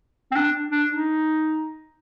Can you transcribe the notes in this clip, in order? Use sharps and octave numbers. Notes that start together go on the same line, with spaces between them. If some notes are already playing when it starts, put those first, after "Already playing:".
C4
D4
D4
D#4